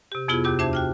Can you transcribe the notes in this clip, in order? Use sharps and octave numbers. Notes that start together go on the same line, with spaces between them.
C3 G4
F2 C3 B3 E4 F4 G#4
D#2 C3 G4 D6
D4 C5 E5 A5 D6 G#6
F#4 G5 F6